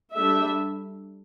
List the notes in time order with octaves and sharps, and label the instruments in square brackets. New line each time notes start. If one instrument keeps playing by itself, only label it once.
[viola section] G3 D4 A4 E5